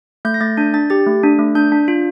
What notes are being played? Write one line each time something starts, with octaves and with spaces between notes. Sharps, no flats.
A3 G6
A#6
A3 A6
D4 G6
D4 A6
G4 A6
A3
D4
A3
D4 G6
D4
F4